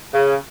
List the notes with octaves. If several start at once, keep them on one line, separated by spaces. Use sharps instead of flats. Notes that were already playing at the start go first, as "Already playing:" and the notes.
C#3